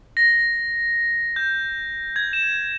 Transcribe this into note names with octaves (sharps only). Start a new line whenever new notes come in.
A#6
G6
G#6
E7